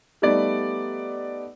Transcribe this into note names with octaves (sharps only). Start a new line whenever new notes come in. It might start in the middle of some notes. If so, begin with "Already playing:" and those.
G3 A3 B3 D#4 D5